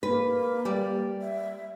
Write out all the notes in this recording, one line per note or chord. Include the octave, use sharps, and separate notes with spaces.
A#3 B4
G3 D5
E5